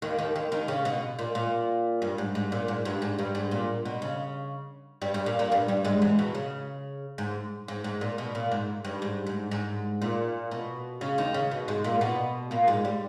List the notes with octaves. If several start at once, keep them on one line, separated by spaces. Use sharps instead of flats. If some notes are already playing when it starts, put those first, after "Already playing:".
D#2 D#3
D#2 D#3
D#2 D#3
D#2 D#3
C#3
B2
A#2
A#2
G2
G#2
G#2
A#2
G#2
G2
G#2
G2
G#2
A#2
B2
C#3
G2 G3
G2 G3
A#2 A#3
A#2 A#3
G2 G3
G2 G3
G#2 G#3
E2 E3
B2
C#3
G#2
G#2
G#2
A#2
B2
A#2
G#2
G2
G#2
G#2
G#2
A#2
B2
C#3
D#2 D#3
C#3
B2
G#2 G#3
A#2 A#3
B2 B3
A#2 A#3
G#2 G#3
G3